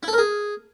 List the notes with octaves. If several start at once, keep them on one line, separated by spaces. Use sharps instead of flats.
E4
A4
A#4
G#4